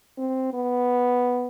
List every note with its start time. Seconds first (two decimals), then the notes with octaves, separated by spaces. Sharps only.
0.18 C4
0.53 B3